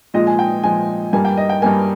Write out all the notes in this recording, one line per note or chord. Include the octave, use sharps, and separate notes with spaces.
A#2 F3 G#3 D#5
G#5
G5
A#2 F3 G#3 G#5
G2 G3 A#3 G#5
G5
D#5
G5
G2 G3 A#3 G#5